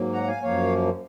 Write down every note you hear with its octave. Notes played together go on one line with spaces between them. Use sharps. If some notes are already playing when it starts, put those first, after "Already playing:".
Already playing: G#2 F#3 A#3
F#5 A#5
F5 G#5
F#2 F3 A#3 C#5 F5